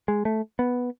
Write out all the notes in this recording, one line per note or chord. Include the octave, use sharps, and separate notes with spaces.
G#3
A3
B3